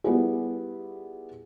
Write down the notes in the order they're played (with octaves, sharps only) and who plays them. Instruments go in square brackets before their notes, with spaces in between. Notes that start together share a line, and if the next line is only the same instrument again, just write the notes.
[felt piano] G3 B3 E4 F4 G4 G#4